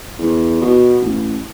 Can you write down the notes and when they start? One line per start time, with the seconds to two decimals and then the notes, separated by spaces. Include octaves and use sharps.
0.19 E2
0.61 B2
1.01 A1